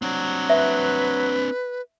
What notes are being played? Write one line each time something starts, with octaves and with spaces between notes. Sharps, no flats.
F#3 C4 D4
B4 E5